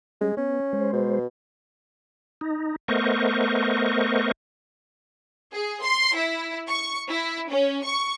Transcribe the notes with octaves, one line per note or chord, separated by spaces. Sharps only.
G3 G#3 C#4 G#4
B3 C#4
G#3 C5
B2
D#4
A3 B3 A#4 C5 D#5 C#6
G#4
C6
E4
C#6
E4
C#4
C#6